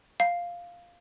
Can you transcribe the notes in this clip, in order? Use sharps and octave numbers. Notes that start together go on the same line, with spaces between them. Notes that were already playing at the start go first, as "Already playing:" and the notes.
F5